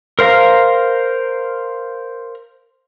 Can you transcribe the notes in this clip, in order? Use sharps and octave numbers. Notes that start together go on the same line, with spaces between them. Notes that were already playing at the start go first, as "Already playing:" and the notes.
A#4 C5 F5 A#5